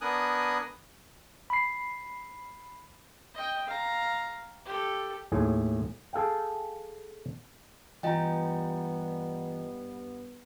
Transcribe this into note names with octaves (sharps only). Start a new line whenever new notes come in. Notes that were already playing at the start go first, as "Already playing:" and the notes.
B3 D4 A#4 G#5 D#6 F#6
B5 C7
D#5 G5
F5 A#5
G4 A4
D#2 A2 G#4
G#4 A4 F5 G5
G2 E3 B3 F4 D#5 G5 G#5 A#5